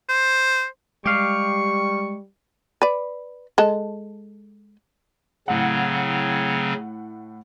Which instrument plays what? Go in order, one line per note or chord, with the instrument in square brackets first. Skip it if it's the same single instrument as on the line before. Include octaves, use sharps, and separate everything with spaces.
[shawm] C5
[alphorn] G3 [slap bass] G#3 [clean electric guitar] G4 F5 [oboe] C#6
[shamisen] B4 D5
G#3 A4
[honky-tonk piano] A2 F#5 [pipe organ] C#3 F#3 C4